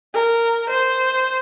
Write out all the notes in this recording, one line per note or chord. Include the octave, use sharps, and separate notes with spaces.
A#4
C5